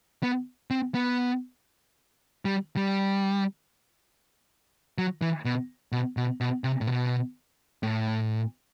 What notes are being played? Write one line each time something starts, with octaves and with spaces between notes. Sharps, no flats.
B3
C4
B3
G3
G3
F#3
E3
B2
B2
B2
B2
C3
A2
B2
A2